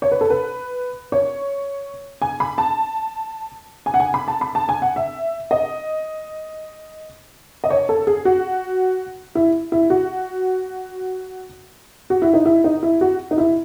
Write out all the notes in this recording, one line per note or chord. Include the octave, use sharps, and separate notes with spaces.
C#5
B4
A4
B4
C#5
G#5
B5
A5
G#5
F#5
G#5
B5
A5
B5
A5
G#5
F#5
E5
D#5
D#5
C#5
A4
G#4
F#4
E4
E4
F#4
F#4
E4
D#4
E4
D#4
E4
F#4
D#4
E4